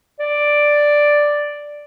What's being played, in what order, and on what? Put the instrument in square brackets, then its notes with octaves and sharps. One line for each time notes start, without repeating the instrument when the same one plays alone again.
[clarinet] D5